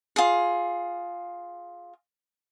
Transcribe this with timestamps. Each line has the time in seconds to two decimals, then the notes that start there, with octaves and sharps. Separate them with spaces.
0.16 F4 G#4